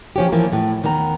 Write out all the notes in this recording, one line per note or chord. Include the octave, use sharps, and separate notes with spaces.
F3 C#4 G4
A2 E3 F3 A#3
A2
D#2 D#3 B3 C#5 A#5